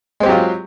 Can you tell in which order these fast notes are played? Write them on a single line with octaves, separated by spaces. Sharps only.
G#3 C4 G4 F#3 F4